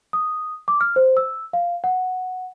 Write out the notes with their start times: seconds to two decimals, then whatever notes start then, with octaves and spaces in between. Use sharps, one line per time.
0.13 D#6
0.68 D6
0.81 F6
0.96 C5
1.17 E6
1.53 F5
1.84 F#5